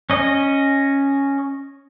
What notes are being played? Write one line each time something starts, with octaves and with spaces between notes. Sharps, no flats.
C#4 D#5